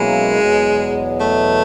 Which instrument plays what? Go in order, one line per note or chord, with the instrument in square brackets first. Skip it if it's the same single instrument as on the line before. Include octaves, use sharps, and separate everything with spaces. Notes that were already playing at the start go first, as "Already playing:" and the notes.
Already playing: [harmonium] B2 F#3 A#3 C#4 E4 [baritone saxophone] G#3
[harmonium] E2 B2 F#3 B3
[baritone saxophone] A3